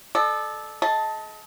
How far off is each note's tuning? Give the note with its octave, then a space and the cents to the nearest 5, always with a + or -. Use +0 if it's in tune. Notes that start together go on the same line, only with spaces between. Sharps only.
A4 -20 D5 +40
G#4 +35 D#5 +25 A5 +0